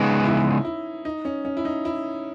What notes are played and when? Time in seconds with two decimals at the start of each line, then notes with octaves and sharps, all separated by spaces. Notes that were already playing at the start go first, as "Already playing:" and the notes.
Already playing: C#3 G#3 B3 C#4 D#4
0.25 E4
0.65 E4
1.05 D#4
1.25 C#4
1.45 C#4
1.57 E4
1.65 D#4
1.85 E4